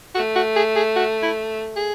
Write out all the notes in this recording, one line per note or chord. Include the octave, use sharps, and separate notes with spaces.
A3 F#4
F#4
G#4
G#4
F#4
E4
G#4